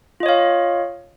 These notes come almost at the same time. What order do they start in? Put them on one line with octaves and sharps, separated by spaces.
F4 D#5 C#5 F5